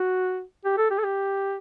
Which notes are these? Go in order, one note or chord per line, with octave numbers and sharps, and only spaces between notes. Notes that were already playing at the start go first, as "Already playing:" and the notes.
Already playing: F#4
G4
A4
G4
A4
G4